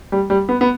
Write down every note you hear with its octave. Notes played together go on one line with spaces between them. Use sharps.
G3
G3
B3
B3